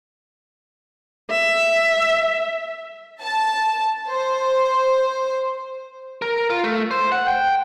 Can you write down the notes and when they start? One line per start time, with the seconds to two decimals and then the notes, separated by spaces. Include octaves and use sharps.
1.31 E5
3.21 A5
4.08 C5
6.22 A#4
6.50 F4
6.64 A3
6.91 C5
7.12 F#5
7.28 G5